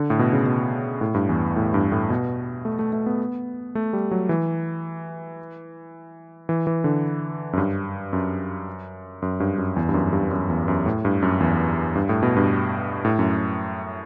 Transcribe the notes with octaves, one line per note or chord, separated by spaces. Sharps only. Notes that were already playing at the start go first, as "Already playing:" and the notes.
Already playing: D3
A2
B2
C#3
B2
A2
G2
E2
A2
G2
A2
B2
A3
A3
A3
B3
A3
G3
F#3
E3
E3
E3
D3
F#2
G2
F#2
F#2
G2
F#2
E2
G2
F#2
G2
F#2
E2
F#2
A2
G2
F#2
E2
G2
A2
B2
G2
A2
F#2